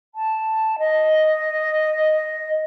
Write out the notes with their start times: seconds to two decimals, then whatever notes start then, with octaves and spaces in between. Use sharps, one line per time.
0.14 A5
0.78 D#5